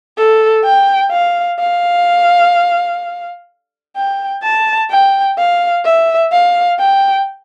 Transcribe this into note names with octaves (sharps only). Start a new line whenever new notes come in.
A4
G5
F5
F5
G5
A5
G5
F5
E5
F5
G5